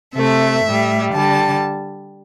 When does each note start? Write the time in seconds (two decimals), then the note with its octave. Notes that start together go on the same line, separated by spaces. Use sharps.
0.15 C3 A3 E5
0.63 A2 G3
1.12 D3 G3 A5